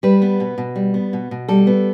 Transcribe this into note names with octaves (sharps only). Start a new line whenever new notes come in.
G3 B4
B3
B2
B2
G3
B3
B2
B2
G3 A4
B3